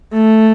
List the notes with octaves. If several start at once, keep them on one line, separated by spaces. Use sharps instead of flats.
A3